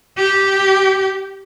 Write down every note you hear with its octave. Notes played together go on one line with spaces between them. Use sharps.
G4